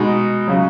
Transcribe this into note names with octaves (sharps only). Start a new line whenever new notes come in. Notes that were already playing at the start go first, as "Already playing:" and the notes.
Already playing: B2 G#3 D#4
C#3 F#3